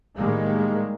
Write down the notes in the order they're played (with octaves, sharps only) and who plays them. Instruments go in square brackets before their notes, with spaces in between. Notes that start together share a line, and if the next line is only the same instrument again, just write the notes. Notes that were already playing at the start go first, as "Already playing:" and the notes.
[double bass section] A2 D#3 G3 G#3 A#3